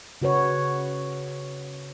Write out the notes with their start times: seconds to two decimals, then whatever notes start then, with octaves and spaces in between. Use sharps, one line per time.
0.22 C#3 F#4 B4 C#5